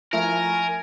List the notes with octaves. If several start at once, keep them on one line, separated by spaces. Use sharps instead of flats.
F3 A3 E4 A#4 G#5